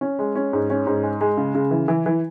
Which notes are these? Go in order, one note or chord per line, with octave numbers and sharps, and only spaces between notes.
C#4
G#3
C#4
G#2
C#4
G#2
G#3
G#3
C#3
C#3
E3
E3
E3